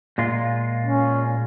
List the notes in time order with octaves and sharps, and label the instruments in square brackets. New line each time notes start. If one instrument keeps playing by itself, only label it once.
[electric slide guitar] A#2 G#3 F4
[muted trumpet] C#4